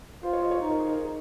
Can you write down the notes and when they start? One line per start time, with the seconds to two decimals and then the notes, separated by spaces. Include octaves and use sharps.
0.23 F4 C5
0.33 C#5
0.42 D#5
0.51 C#5
0.61 D#4
0.70 A#4
0.79 G#4
0.88 A#4